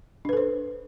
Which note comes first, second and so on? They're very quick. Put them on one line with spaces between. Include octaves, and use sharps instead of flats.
D4 B4 A4 C5